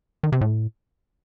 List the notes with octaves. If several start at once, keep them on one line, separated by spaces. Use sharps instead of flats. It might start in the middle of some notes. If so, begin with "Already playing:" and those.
D#3
C3
A2